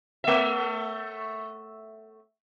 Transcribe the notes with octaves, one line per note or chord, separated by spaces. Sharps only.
A3 E5